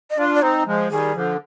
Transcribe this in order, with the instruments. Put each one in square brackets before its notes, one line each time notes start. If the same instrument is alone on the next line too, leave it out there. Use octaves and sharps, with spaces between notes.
[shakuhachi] D#5
[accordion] D4 F4 [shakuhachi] D5
[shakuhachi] D5
[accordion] C4 D#4 [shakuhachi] C5
[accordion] F3 G#3
[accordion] D#3 G3 [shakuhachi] G#4
[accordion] D3 F3